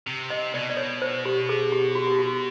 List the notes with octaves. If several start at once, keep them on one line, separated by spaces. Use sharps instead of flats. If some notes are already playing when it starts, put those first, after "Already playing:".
C3
D#5
B2 D5
D5
C#5
C5
G4
G#4
G4
F#4
G4
F#4